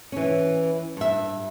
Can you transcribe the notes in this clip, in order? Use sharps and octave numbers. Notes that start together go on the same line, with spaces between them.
E3 C#4
G2 E5